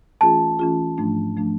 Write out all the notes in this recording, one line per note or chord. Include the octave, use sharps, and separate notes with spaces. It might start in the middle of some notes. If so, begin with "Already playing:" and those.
E3 A3 C#4 F4 G#4 A5
E3 A3 C#4 F4 G#4
G#2 F3 A3 D4
F3 A3 D4